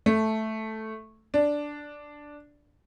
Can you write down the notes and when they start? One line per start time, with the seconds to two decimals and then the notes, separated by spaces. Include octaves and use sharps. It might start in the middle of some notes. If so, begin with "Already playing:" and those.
0.06 A3
1.34 D4